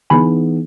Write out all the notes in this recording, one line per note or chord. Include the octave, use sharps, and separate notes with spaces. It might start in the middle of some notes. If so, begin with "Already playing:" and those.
E3 B3 D#4 G#4 G#5 B5